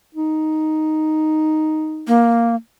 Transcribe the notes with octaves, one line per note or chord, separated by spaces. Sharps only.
D#4
A#3